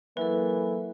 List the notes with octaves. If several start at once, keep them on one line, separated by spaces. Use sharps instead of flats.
E3 F#3 A#3 E4 A4 B4